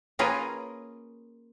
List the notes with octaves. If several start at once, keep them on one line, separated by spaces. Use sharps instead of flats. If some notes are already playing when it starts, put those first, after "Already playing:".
A#3 C#4 F4 G#4 A#4 B4